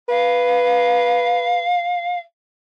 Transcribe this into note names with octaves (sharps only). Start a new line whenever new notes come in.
B4 F5